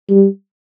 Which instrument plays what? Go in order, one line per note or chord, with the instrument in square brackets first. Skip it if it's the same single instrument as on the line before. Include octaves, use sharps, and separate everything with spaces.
[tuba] G3